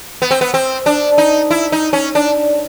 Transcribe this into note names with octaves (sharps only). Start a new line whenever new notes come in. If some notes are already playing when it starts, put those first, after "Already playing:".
B3
C4
B3
C4
D4
D#4
E4
D#4
C#4
D4